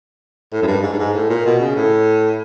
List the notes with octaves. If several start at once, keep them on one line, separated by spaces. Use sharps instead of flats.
A2
F#2
G2
G#2
G2
G#2
A2
A#2
B2
C#3
A2